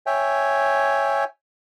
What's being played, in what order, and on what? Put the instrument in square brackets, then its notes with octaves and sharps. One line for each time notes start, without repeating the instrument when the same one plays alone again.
[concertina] C#5 E5 G5 G#5